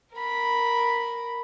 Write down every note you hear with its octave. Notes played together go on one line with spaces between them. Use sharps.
A#4 B5